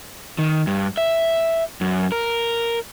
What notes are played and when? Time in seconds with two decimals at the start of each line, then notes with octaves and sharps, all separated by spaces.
0.38 D#3
0.67 G2
0.97 E5
1.81 F#2
2.12 A#4